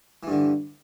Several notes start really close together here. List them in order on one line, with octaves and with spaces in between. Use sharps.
E3 G2 D3